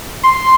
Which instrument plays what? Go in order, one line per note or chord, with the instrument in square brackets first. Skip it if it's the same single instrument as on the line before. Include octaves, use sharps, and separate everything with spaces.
[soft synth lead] C6